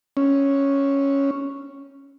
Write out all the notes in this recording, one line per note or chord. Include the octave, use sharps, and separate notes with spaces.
C#4